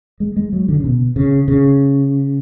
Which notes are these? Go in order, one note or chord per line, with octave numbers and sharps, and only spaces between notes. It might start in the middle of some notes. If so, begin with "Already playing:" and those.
G#3
G#3
F#3
D3
C#3
B2
C#3
C#3